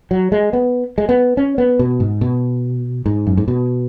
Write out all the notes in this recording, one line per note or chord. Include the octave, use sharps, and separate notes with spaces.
F#3
G#3
B3
G#3
B3
C#4
B3
B2
G#2
B2
G#2
F#2
G#2
B2